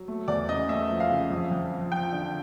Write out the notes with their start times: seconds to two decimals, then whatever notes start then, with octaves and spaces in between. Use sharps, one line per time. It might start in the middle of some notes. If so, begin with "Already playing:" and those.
Already playing: F#3
0.08 A3
0.28 E2 D5
0.49 C#3 D#5
0.69 A3 E5
0.90 F3
1.00 F5
1.10 C#3
1.30 F2
1.51 F2
1.72 F3
1.91 F3 G5
2.13 D3